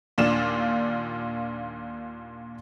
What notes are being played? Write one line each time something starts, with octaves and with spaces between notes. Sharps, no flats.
D#2 A#2 D4 F4 E7